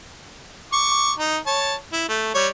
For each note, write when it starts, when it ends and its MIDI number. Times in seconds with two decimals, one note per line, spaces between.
0.73 1.12 85
0.73 1.12 86
1.18 1.37 63
1.47 1.75 73
1.47 1.75 81
1.92 2.05 64
2.09 2.30 57
2.35 2.48 55
2.35 2.48 73